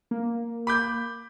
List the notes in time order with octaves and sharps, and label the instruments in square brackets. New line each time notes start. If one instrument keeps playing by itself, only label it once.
[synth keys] A#3
[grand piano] B5 D6 G6